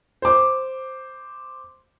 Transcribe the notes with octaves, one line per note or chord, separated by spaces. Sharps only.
C5 D6